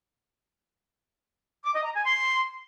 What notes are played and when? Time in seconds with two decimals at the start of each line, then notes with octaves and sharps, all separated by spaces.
1.65 D6
1.75 D#5
1.85 A#5
1.96 G#5
2.06 C6